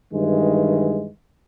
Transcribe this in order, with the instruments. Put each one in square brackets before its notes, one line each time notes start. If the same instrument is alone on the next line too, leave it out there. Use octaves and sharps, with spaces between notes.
[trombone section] G2 D#3 E3 G#3